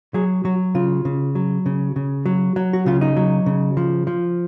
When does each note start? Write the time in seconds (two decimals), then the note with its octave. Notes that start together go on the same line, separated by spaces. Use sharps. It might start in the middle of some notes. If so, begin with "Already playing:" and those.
0.14 F#3 G#4
0.45 F#3 F#4
0.75 C#3 F4
1.05 C#3
1.35 F#3
1.66 C#3
1.96 C#3
2.26 F#3
2.56 F#3
2.73 F#4
2.86 C#3 F4
3.01 D#4
3.17 F#3
3.46 C#3
3.77 F3
4.07 F3